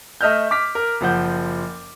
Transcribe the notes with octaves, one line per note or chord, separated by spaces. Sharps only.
A3 D#5 E5 F6 G6
D6 F6 B6
A#4
F#1 F3 F#5 G6